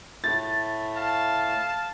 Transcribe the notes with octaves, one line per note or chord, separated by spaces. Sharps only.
A2 A3 A6
F5 A5